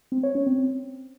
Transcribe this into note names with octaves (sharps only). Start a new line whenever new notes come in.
C4
C#5
C#4
C4
C4